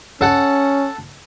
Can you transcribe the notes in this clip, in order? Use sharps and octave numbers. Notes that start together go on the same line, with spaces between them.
C#4 A4 F#5